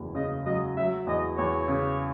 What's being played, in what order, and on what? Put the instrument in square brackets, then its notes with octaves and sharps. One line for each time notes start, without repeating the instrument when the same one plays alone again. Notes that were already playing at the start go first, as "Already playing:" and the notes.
Already playing: [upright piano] F#1 E2 F#3
[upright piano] C#3 [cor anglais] D#5
[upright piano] F#3 [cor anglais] D#5
[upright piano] F#3 [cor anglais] E5
[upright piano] E2 [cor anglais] D#5
[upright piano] E2 [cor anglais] C#5
[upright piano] C#3